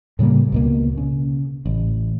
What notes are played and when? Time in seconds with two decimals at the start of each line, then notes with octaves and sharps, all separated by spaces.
0.19 A2 C#3 G3 A#3
0.52 C#2 B2 A#3
0.97 C#3
1.66 A1